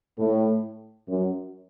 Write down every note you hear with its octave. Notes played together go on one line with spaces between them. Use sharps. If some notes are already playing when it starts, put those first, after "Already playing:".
A2
F#2